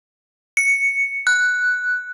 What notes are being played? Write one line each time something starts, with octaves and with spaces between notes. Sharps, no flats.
C#7
F#6